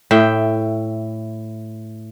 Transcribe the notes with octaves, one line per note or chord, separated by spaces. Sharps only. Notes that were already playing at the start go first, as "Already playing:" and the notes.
A2 E5 G5